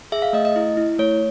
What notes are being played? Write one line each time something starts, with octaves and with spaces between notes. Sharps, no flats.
G#4 E5
F5
A3 D#5
D#5
E4
E4
A3 C#5